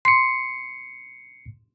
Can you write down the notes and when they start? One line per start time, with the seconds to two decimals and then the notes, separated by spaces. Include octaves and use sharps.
0.05 C6 C7 C#7